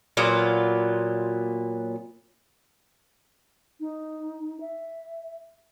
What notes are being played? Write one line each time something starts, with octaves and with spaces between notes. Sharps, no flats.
A#2 F#3 B3 F4
D#4
E5